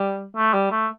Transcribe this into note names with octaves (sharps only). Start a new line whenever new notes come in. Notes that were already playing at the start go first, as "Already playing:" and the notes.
Already playing: G3
A3
G3
A3